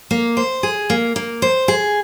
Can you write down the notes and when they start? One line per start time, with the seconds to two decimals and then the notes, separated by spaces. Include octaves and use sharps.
0.11 A#3
0.37 C5
0.63 G#4
0.90 A#3
1.16 A#3
1.42 C5
1.68 G#4